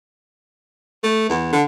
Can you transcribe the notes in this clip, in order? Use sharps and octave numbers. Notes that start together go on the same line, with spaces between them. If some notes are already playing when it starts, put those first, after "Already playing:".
A3
E2
D3